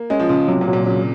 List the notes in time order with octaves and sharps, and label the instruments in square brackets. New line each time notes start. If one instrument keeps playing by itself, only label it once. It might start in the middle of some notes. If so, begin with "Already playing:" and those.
Already playing: [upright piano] A#3
[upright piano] G#3 [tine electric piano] C#4
[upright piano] F3
[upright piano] C#3 [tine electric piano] F4
[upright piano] C3 [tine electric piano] F#3
[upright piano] A#2
[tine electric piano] F#3
[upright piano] A#2
[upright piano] C#3 [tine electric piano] F#3